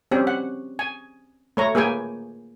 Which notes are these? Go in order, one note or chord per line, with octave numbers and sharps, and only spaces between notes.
C4 C#4 G4
F#5
G#5
A3 C#5 A#5
A#3 G#4 B4 G5 G#5